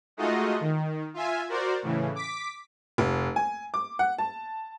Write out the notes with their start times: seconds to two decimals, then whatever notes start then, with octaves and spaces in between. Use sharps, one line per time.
0.17 G#3 A3 D#4 F4 F#4 D#5
0.61 D#3
1.14 F4 E5 G#5
1.49 F#4 A#4 C5 D5
1.82 A2 C#3 E3
2.15 D6 B6
2.98 F1
3.36 G#5
3.74 D6
3.99 F#5
4.19 A5